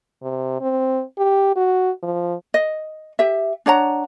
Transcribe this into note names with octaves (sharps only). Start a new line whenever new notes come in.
C3
C4
G4
F#4
F3
D#5
G4 E5
D4 C#5 F#5 A#5